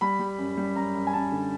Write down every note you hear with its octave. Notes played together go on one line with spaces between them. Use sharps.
G3 B5
G3
F#2
G3
F#2 A#5
F#2
G#5
F#2 A5
D3